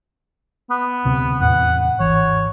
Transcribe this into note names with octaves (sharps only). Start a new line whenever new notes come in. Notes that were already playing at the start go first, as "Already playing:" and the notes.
B3
D2 C3
E2 A2 C3 F#5
G#1 E3 C#5